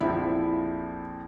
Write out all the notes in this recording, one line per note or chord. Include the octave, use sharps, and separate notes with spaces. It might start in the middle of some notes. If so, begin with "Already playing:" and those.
A#1 F2 F3 E4